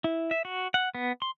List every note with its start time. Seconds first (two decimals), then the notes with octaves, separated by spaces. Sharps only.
0.04 E4
0.31 E5
0.45 F#4
0.74 F#5
0.95 B3
1.22 C6